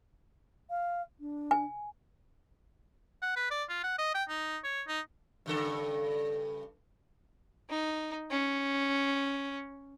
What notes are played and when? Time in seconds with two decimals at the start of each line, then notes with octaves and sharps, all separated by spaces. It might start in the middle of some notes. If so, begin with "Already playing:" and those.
0.70 F5
1.20 D4
1.51 G#5
3.22 F#5
3.36 B4
3.51 D5
3.69 F4
3.83 F#5
3.98 D#5
4.15 G5
4.29 D#4
4.64 C#5
4.87 D#4
5.46 G2 C#3 A4
7.69 D#4
8.30 C#4